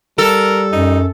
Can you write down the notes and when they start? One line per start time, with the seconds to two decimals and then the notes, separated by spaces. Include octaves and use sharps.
0.18 G3 A4 A#4
0.73 F#2 D#4